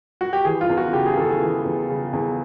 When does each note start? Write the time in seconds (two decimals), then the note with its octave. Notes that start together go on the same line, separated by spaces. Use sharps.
0.21 F#4
0.33 G4
0.45 E3 G#4
0.61 F4
0.70 E2
0.77 F#4
0.93 C#3 G4
1.06 G#4
1.17 E2 A4
1.30 G#4
1.42 E3
1.65 E2
1.89 C#3
2.13 E2